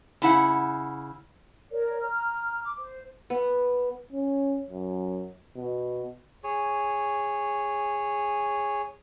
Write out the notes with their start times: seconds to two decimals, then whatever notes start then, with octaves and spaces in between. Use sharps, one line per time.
0.22 C#3 E4 F#5
1.71 A#4 C#5 D5
2.00 A#5 F6
2.63 D6
2.80 C5
3.30 B3
4.12 C#4
4.70 F#2
5.56 B2
6.44 G#4 C#5